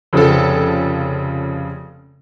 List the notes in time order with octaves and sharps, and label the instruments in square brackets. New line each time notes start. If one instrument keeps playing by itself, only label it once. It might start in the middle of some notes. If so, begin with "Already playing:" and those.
[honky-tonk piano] F1 C#3 F3 A4